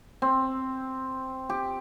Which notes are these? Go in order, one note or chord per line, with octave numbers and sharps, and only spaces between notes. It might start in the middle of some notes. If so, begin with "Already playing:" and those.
C4
G4